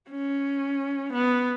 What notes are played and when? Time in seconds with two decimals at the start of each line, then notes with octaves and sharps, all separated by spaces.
0.10 C#4
1.13 B3